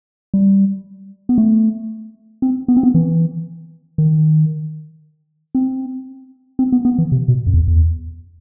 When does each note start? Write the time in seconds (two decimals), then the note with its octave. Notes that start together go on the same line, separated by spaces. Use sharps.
0.34 G3
1.29 B3
1.38 A3
2.42 C4
2.68 B3
2.77 C4
2.83 B3
2.94 E3
3.98 D#3
5.55 C4
6.59 C4
6.72 B3
6.85 B3
6.98 E3
7.12 C3
7.28 B2
7.47 F#2
7.54 E2
7.68 E2